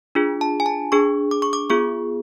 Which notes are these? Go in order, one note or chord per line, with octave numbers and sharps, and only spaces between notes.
D4 F4 G#4
A5
G#5
A5
D4 G#4 C#6
D6
C#6
D6
B3 F4 G#4 C#6